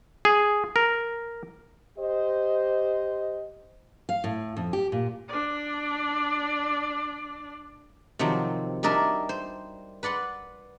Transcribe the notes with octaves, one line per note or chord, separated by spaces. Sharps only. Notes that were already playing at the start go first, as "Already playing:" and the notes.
G#4
A#4
G4 C5 D#5
F5
A2
F2
G4
A#2
D4 D5
C3 D#3 F3 F#3 C4
G3 D4 D#4 A#4 D5 E5
C5
B4 D5 F#5 C6